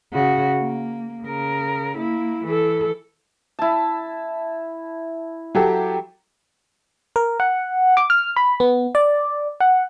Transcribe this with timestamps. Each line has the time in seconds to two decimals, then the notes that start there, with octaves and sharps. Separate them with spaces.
0.13 C#3 F#4
0.60 A#3
1.24 C#3 A#4
1.98 A#3 E4
2.46 E3 A4
3.59 E4 A5
5.55 F#3 G4 A4
7.16 A#4
7.40 F#5
7.97 D6
8.10 F6
8.36 B5
8.60 B3
8.95 D5
9.61 F#5